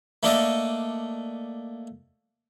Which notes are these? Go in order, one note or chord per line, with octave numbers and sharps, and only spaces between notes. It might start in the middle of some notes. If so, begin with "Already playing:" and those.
A3 A#3 D4 A4 D#5